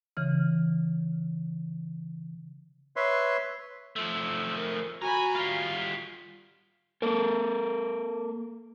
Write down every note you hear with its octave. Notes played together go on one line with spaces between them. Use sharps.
C#3 E3 F6
B4 C#5 E5 C6
F3 A3 E6
A#4
C#2 F#4 G#5 A#5 B5
G3 F4 F5
A#3 A4 A#4